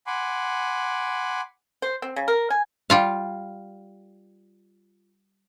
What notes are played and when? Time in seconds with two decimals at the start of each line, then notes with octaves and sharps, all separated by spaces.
0.07 F#5 G#5 B5 C6 D6
1.82 C5
2.02 C4
2.16 C#3
2.28 A#4
2.50 G#5
2.90 G3 F4 F5